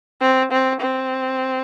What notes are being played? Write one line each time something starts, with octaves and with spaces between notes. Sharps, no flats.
C4
C4
C4